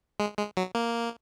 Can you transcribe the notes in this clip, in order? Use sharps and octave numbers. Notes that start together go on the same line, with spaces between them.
G#3
G#3
F#3
A#3